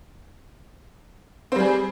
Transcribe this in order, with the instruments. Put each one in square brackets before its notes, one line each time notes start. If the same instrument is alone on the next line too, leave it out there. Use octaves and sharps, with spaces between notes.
[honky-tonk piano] C4
G3
G#4